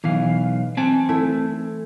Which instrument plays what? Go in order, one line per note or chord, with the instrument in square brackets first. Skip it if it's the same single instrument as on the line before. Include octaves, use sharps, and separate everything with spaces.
[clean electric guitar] B1 F5 [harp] E3
[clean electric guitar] C4 A5 [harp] G#5
[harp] A3 E4